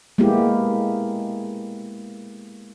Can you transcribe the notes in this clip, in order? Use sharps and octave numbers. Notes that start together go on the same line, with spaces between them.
G#3 A#3 B3 E4 G4